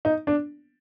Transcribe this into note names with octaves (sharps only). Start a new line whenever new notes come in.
D#4
D4